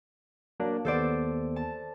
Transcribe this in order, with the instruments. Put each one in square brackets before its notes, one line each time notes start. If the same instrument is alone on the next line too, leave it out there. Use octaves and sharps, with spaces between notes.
[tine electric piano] F#3 A#3 D4
[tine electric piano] D#2 B3 [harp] A4 C5 D5
[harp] A5